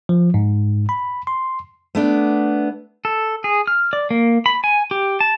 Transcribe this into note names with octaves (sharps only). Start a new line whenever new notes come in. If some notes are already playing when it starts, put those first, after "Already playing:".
F3
G#2
B5
C6
A3 B3 D4
A4
G#4
F6
D5
A#3
B5
G#5
G4
A5